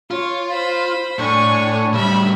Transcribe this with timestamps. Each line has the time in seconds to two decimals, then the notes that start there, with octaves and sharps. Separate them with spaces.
0.11 F4 C#5
0.50 C5 B5
1.19 A2 D4 C#5 G#5 C#6
1.94 A2 G3 E5 B5